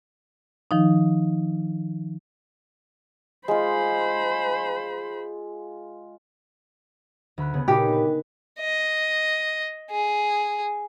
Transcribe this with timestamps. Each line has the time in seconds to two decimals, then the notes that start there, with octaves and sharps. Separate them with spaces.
0.71 D#3 F3 D#4
3.48 G#3 F4 C5 B5
7.38 D2 B5 F#6
7.54 C#3 B3 G#4
7.68 A#2 D#4 G4 B5
7.88 D4 B4
8.60 D#5
9.91 G#4